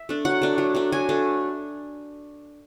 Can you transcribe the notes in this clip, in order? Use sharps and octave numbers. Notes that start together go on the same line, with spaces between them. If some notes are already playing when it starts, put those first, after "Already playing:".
Already playing: E5
A3 D4
F#3 F#5
A3 D4
F#3
A3 D4
F#3 G#5
A3 D4